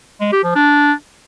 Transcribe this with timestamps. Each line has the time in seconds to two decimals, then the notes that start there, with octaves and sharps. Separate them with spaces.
0.20 G#3
0.32 G4
0.44 F3
0.55 D4